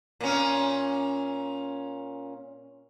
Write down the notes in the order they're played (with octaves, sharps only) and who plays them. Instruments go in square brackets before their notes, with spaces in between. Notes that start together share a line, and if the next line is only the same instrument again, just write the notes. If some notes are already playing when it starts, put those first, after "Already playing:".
[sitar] A#2 C#4